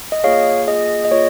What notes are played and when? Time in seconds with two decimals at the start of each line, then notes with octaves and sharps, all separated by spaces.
0.12 D#5
0.24 A#3 F4 G#4 C#5 F5
0.67 A#3 F4 G#4 D#5
1.05 D#5
1.11 A#3 F4 G#4 C#5